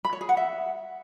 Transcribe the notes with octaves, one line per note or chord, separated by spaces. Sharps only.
B5
C#5
G#4
F#5
E5